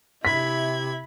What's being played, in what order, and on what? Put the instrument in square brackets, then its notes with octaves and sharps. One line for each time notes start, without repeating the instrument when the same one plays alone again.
[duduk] C3 [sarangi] E4 [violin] B5 G#6 [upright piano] B6